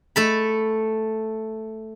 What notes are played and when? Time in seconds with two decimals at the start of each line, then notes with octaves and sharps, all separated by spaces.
0.16 A3 A4 B5